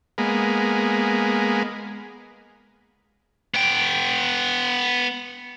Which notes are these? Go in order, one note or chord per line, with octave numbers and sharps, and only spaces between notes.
G#3 A#3 B3
B3 G5